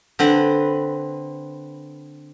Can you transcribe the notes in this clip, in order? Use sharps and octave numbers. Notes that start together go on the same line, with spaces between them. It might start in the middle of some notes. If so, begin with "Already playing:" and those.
D3 C4 B4